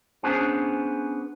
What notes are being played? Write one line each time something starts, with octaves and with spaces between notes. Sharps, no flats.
B3 C#4 D4 G#4 C5